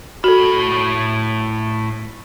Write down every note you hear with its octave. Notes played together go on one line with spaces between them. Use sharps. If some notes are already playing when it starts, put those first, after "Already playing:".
A2 F#4 A4 B5